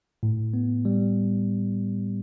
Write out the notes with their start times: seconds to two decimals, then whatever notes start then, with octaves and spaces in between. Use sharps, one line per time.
0.23 A2
0.54 B3
0.85 G3